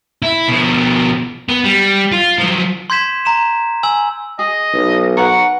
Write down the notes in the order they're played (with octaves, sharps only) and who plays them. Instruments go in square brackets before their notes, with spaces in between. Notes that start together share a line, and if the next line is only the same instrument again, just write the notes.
[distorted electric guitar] E4
B2 F3
B3
G3
F4
F3 F#3
[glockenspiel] C6 G6 G#6 B6 E7
A#5 C6 E7
G#5 E6 F#7
[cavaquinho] G#4 [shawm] D#5
[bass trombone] B1
[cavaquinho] A#4 B4 F#5 [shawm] C#6